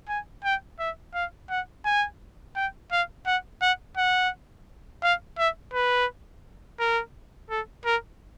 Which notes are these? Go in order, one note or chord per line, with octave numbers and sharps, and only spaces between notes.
G#5
G5
E5
F5
F#5
G#5
G5
F5
F#5
F#5
F#5
F5
E5
B4
A#4
A4
A#4